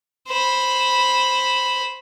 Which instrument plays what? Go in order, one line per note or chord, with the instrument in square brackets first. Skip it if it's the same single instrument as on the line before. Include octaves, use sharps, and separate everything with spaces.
[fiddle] C5 B5